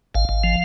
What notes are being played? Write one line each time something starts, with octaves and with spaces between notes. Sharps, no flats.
G#1 F5
G#1
F3